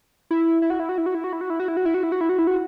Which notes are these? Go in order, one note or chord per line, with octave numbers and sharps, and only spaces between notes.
E4
E4
F#4
E4
F#4
E4
F#4
E4
F#4
E4
F#4
E4
F#4
E4
F#4
E4
F#4
E4
F#4
E4
F#4
E4
F#4